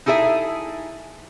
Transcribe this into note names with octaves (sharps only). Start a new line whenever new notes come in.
D#4 E4 G#4 A4 E5